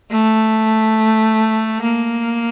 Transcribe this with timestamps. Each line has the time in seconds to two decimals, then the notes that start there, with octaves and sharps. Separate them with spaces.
0.11 A3
1.82 A#3